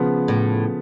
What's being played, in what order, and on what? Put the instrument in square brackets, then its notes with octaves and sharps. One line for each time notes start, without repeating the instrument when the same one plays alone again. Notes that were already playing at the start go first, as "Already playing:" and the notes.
Already playing: [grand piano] C#3 F3 B3
[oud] A2